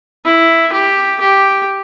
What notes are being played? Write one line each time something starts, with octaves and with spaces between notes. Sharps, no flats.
E4
G4
G4